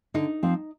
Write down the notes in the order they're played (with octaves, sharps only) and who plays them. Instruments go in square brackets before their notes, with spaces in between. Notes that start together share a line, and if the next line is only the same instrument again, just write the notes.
[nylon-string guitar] D3 [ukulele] D#4
[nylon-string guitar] F3 C4